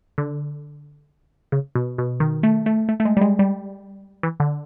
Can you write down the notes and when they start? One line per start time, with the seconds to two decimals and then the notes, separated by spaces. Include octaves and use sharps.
0.18 D3
1.52 C#3
1.75 B2
1.98 B2
2.20 D#3
2.43 A3
2.66 A3
2.89 A3
3.00 A3
3.05 G#3
3.17 G3
3.21 G#3
3.39 G3
4.23 E3
4.40 D3